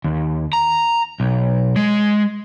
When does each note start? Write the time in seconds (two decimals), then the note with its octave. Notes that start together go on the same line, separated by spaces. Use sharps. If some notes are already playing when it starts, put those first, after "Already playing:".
0.04 D#2
0.53 A#5
1.20 B1
1.76 G#3